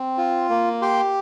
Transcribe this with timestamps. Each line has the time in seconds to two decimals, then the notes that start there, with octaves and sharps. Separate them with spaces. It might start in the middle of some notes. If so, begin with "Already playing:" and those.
Already playing: C4
0.18 F4
0.49 A#3
0.82 G4 G5 C6